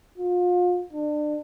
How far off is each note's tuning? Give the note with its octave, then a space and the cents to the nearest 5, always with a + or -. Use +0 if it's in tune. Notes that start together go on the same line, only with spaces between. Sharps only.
F4 +35
D4 +30